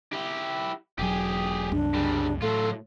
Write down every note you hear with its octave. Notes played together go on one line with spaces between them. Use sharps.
E4 G4
E1 F#3 G4 G#4
C2 F#2 D4
C#3 G3
A2 F#3 F4 A4